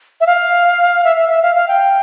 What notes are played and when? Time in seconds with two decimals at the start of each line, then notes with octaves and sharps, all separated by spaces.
0.20 E5
0.27 F5
1.04 E5
1.16 E5
1.29 E5
1.42 F5
1.55 F5
1.68 G5